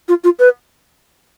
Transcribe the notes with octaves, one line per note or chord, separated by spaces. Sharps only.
F4
F4
B4